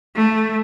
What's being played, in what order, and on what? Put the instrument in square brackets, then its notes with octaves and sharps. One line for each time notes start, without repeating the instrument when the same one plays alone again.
[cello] A3